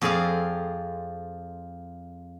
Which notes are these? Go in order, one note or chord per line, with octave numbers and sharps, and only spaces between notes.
F2 C4 G#4 D5 F5